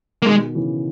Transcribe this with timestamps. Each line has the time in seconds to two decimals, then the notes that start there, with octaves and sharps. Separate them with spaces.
0.22 A#3
0.25 B2 D#3 G#3
0.55 C#3 E3